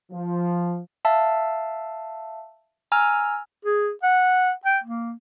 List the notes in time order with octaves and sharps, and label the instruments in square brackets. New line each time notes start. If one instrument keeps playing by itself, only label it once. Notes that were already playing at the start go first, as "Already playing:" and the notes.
[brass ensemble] F3
[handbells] E5 F5 A5 E6
G#5 A#5 E6 F6
[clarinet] G#4
F#5
G5
A#3